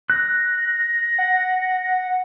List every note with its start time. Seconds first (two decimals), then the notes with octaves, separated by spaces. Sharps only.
0.10 F#6 A#6
1.18 F#5